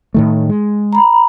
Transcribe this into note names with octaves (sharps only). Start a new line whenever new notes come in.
A2 D#3 A3
G#3
A#5 B5